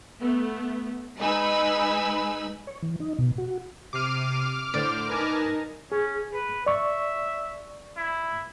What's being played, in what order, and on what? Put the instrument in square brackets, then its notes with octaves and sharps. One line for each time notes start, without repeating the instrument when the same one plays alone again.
[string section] A3 B3
G#3 D#4 B4 G#5 B5 E6
[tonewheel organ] C#5
E3
D#4
B2
F#4
[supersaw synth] C3 C7 D#7 [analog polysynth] D6 F6
[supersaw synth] A2 D3 C5 [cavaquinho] D5
[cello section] D#4 A#4 [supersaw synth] B4 G#5 A5
[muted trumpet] C#4 [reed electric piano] G#4
[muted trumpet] B4
[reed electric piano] D5 C#6 [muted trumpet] E5
[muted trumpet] E4